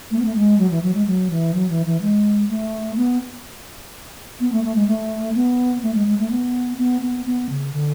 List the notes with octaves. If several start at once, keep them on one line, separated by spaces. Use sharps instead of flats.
A3
B3
A3
G#3
F#3
E3
F#3
G#3
F#3
E3
F#3
E3
E3
G#3
A3
B3
B3
A3
A3
G#3
A3
B3
A3
G#3
G#3
A3
B3
B3
B3
B3
C#3
D3